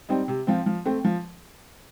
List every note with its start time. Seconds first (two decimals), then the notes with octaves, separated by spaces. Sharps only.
0.09 G3 C4 D#4
0.28 C3
0.47 F3 C4 F4
0.66 F3
0.86 A3 C4
1.05 F3